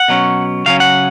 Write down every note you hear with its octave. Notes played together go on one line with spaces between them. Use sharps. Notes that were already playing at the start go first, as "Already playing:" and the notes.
Already playing: F#5
B2 F#3 C#4
C#3 F#3 C#4 F5
F#5